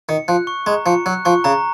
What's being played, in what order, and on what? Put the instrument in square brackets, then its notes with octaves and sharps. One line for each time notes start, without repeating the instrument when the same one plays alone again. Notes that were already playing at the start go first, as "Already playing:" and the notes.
[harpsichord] D#3 [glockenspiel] C#7
[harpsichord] F3 [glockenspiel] F#6
[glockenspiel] C#6
[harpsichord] G#3 [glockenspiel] A#5
[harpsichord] F3 [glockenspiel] C#7
[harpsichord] F#3 [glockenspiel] F#6
[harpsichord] F3 [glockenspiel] C#6
[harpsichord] C#3 [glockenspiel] A#5